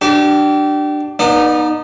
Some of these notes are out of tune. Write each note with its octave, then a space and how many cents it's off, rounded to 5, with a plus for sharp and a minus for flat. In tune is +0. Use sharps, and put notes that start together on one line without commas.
D4 +15 G4 -30
B3 -40 D#4 -15 D5 +20